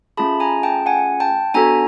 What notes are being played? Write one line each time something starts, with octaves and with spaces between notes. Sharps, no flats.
A3 C#4 F4 G#4 A5 B5
G#5 A#5
G5 A5
F#5 G#5
G5 A5
B3 D4 F#4 A4 G#5 A#5